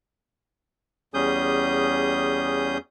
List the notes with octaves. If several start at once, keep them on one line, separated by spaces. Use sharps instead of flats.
E2 G3 C#4 G#4 D#6 G6